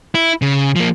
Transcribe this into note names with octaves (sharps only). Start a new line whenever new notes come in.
E4
C#3
F3 A#3